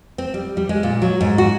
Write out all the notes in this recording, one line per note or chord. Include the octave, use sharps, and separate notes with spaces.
C4
G3
G3
G#3
A#2
F#3
G#2
F#4